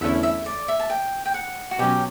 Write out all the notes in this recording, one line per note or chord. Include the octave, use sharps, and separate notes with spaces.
E2 D3 A3 C#4 E4 E5
E5
D5
E5
A5
G5
G5
F#5
F#4
B2 F#3 C#4 G4